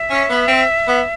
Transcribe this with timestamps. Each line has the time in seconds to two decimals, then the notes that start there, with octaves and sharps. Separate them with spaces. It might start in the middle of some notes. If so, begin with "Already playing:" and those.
Already playing: E5
0.10 C#4
0.29 B3
0.48 C4
0.88 B3